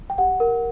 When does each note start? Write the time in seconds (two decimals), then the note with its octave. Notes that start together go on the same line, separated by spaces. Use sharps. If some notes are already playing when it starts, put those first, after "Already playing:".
0.10 G5
0.18 G4 F#5
0.40 A#4